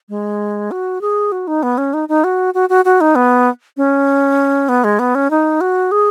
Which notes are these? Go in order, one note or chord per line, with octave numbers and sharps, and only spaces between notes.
G#3
F#4
G#4
F#4
D#4
B3
C#4
D#4
D#4
F#4
F#4
F#4
F#4
D#4
B3
C#4
B3
G#3
B3
C#4
D#4
F#4
G#4